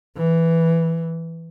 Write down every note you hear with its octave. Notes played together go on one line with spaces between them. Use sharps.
E3